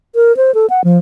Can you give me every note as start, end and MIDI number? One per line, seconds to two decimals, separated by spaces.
0.15 0.35 70
0.37 0.54 72
0.54 0.66 69
0.70 0.84 78
0.84 0.98 53